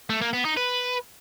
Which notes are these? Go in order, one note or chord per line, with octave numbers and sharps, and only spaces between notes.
A3
A#3
B3
D#4
B4